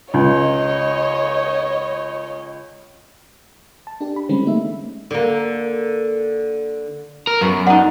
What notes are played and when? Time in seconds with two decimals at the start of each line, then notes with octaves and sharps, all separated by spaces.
0.14 C#2 C#5 D#5
3.87 A5
4.01 D4 G4
4.16 B5
4.29 D3 E3 G3 G#3 C4 C#4
4.44 A3 A#3 D#4 E5
5.11 D3 A#3
7.27 A#4
7.41 F#2 B3 F#4
7.67 D4 D#4 F#5